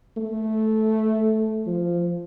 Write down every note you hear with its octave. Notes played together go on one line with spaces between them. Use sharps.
A3
F3